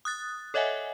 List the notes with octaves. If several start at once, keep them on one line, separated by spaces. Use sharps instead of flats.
D#6 F#6 A6
A4 C#5 D#5 E5 F#5 G#5